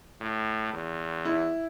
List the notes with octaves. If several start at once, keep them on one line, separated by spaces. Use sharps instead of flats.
A2
E2
E4